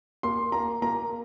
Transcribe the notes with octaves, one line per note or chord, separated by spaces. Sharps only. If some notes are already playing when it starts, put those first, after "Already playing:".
A#3 C6
A#3 A#5
A#3 A#5